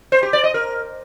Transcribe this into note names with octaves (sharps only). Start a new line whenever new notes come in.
C5
G4
D5
D#5
A#4